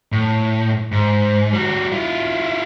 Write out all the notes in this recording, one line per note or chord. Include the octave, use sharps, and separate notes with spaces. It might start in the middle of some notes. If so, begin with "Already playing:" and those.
A2
G#2
G3 F#4
E4 F4